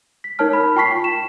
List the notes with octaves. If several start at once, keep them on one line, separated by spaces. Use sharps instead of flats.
B6
D#4 A#4 C#5 A5 F6
B5
F4 G5 A5 C#6 B6 C7
G5
E7